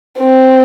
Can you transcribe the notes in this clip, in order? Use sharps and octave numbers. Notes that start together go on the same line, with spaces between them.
C4